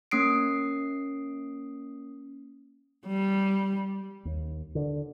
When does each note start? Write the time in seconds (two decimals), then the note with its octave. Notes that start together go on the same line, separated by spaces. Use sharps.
0.11 A#3 C#4 D#6 C7 D7
3.06 G3
4.25 D#2
4.75 D3